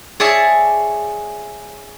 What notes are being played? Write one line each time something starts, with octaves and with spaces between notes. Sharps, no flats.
G#4 C#5 D5 E5 G#5 A5